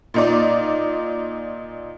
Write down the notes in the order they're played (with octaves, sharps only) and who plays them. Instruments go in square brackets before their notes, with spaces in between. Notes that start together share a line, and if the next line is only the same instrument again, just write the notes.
[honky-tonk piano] A#2 D#4 D5